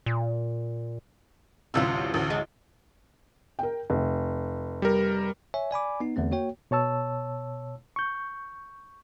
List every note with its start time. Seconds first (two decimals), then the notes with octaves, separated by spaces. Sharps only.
0.06 A#2
1.74 A1 D2 C3 G3 F4 E6
2.14 A1 D2
2.30 G#3
3.59 A#4 G5
3.90 F1
4.82 G3 A#4
5.54 C#5 E5 G#5
5.71 D5 G#5 B5 D6
6.00 B3 D#4
6.16 E2 D3 A3 C4
6.31 A#3 F#4 C#5 G5
6.71 B2 C#5 A5 E6
7.96 C#6 G6